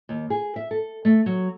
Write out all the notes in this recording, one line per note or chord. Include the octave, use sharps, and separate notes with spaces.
D#2
G#4
E5
A4
A3
F#3